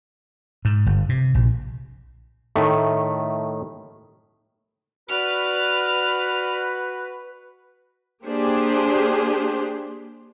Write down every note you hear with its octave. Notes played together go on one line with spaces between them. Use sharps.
G#2
G1
C3
A#1
A2 D#3 A3
F#4 B4 D5 F6
A#3 D4 G4 G#4 C5